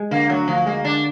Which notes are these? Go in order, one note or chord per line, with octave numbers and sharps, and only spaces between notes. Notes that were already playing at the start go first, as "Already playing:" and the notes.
Already playing: G#3
D3 A#3
D2 F#3
D2 F3
G#3 A#3
D3 D4